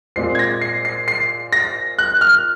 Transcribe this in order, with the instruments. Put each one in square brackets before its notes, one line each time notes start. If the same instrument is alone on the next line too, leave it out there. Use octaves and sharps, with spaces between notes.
[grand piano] A#2 G#3 C4 C7
G#6
A#6
C7
C7
C7
A#6
F#6
F6